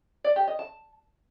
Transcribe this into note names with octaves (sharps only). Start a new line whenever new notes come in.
D5
G4
D#5
A5